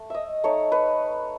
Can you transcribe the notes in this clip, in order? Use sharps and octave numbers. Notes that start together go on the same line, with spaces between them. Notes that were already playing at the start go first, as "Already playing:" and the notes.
Already playing: A3
D#5 E5
A3 D#4 C#5
B4